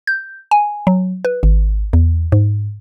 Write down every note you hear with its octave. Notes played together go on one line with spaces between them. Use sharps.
G6
G#5
F#3
B4
G#1
E2
G#2